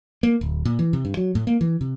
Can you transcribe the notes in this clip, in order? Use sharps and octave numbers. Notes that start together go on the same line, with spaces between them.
A#3
D1
A#2
E3
C3
G2
F#3
A2
A#3
E3
C3